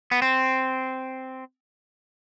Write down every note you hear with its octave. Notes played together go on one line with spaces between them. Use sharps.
B3
C4